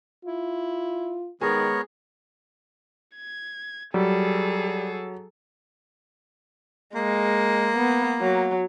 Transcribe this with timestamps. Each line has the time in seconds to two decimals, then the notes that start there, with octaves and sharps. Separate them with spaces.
0.25 E4 F4
1.41 D#3 G#3 B3 G#4 A#4 C#5
3.16 G#6
3.94 F#3 G3 G#4 A4
6.95 G#3 A#3
7.76 B3
8.21 F#3